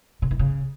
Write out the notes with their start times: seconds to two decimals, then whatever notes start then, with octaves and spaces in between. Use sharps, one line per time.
0.22 C#3
0.31 E3
0.39 C#3